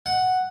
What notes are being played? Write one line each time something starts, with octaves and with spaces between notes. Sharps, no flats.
F#5